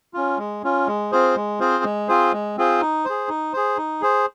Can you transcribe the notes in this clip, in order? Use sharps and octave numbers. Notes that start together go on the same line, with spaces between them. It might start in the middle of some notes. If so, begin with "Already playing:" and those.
C#4 F4
G#3
C#4 F4
G#3
C4 F4 G#4 C5
G#3
C4 F4 G#4 C5
G#3
C4 F4 G#4 C5
G#3
C4 F4 G#4 C5
D#4
G#4 C5
D#4
G#4 C5
D#4
G#4 C5